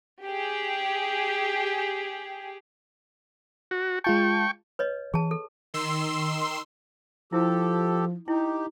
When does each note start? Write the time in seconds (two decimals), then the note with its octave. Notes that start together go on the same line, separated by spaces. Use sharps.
0.21 G4 G#4
3.71 F#4
4.04 G#3 F4 G5 A5 C#6
4.79 B4 C#5 D#5
5.14 E3 G#4 A5
5.31 A4
5.74 D#3 C6 E6
7.33 F3 E4 G4 A4
8.28 D#4 E4 G4